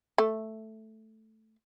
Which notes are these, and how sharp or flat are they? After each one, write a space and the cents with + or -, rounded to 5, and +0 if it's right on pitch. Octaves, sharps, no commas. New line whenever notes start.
A3 +0